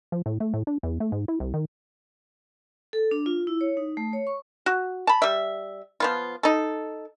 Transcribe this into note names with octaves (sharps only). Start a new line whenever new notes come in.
F3
A2
A3
A2
D4
E2
A3
G#2
E4
C2
D#3
A4
D4
F4
E4
C#5
D#4
A3
C#5
C#6
F#4
A5 B5
G3 E5
F3 B3 F4
D#4 A4